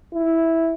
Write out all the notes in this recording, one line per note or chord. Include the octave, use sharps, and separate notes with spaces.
E4